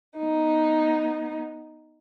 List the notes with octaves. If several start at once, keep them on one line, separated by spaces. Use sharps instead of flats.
B3 D#4